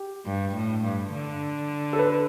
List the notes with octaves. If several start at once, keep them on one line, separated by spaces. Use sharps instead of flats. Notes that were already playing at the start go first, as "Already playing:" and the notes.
Already playing: G4
G2
A2
G2
D3
A4
B4